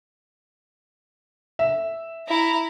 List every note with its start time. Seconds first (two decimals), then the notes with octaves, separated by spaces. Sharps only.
1.59 E5
2.28 E4 A#5